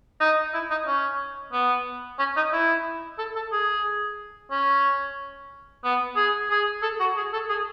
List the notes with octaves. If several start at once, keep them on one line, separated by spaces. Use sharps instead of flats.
D#4
E4
D#4
C#4
B3
C#4
D#4
E4
A4
A4
G#4
C#4
B3
G#4
G#4
A4
F#4
G#4
A4
G#4